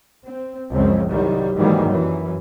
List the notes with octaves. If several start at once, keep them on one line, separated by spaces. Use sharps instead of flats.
C4
C#2 F#2 F3 C4
C2 F#2 D#3 F#3 G3
G#2 D#3 E3 F#3 G3 A#3
F#2 E3